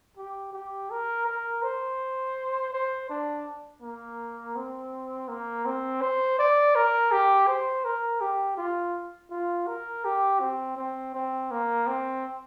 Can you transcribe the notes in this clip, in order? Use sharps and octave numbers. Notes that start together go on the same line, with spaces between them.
G4
G4
A#4
A#4
C5
C5
D4
A#3
C4
A#3
C4
C5
D5
A#4
G4
C5
A#4
G4
F4
F4
A#4
G4
C4
C4
C4
A#3
C4